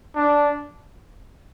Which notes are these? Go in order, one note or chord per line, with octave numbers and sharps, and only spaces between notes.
D4